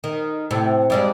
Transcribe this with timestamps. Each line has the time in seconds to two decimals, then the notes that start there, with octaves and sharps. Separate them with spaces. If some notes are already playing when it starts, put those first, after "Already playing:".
0.04 D#3
0.51 A2 C3
0.90 G2 G3 G#3